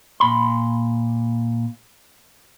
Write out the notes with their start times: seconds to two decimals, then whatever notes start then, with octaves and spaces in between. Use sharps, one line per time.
0.20 A#2 B5 C6